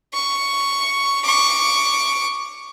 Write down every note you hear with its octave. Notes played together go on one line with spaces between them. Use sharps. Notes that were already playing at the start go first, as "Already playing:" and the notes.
C#6
C#6 D6